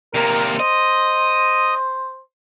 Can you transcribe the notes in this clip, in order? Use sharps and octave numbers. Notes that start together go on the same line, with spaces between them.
C3 A#3 A#4
C5 D#5